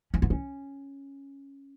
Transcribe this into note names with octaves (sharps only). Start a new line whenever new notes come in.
C#4
B3
C#4